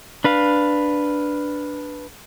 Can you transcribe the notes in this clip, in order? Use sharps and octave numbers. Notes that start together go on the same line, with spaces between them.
D4 B4 F5